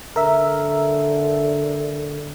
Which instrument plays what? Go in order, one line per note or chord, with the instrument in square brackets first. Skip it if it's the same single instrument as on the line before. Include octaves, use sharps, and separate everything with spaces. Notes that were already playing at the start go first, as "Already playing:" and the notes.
[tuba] D3 [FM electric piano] A#4 E5